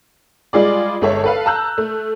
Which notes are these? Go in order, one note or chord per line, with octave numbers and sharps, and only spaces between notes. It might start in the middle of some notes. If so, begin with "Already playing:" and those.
G3 G#3 F4 G#4 D5
G1 G#3 A4 C#5 E5
A4 B4 F5
A5 A#5 E6 F#6 G6
A3